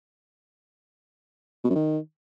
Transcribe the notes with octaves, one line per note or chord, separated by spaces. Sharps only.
B2
F#2
D#3